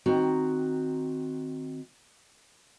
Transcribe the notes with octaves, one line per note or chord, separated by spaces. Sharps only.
D#3 C4 F#4 A#5